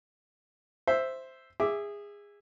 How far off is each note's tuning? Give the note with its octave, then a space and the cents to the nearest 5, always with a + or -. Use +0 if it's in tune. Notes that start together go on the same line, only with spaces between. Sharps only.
C5 +0 E5 +0
G#4 -20 E5 +0 D6 +0